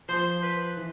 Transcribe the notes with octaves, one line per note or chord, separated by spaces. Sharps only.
F3 C5
B4
E3